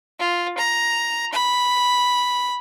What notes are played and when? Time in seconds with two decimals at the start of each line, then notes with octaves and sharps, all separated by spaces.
0.20 F4
0.58 A#5
1.33 B5